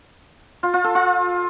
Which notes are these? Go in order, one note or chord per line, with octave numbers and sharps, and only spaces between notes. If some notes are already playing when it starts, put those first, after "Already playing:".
F4
F4
A4
F4